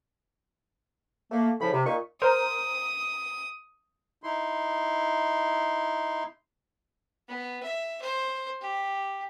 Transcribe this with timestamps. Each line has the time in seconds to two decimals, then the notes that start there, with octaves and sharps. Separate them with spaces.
1.31 A3 A#3
1.60 A2 C#3 F3 E4 B5
1.72 C3
1.85 A#2 D#4 C#6
2.22 A#4 C5 D#6
4.23 D#4 E4 C6
7.28 B3
7.63 E5
8.02 C5
8.61 G4